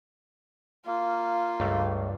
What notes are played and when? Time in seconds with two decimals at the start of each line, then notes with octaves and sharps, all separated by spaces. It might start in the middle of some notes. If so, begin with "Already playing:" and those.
0.86 A#3 F4
1.60 C#2 G2 A3